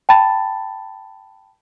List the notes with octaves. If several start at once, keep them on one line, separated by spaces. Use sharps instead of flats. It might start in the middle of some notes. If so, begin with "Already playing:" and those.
G5 A5 B5 A6